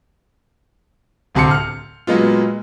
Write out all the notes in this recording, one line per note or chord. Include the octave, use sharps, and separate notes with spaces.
D1 D2 C3 A5 C6 C#7
F6 C#7
A#2 F#3 G#3 B3 F4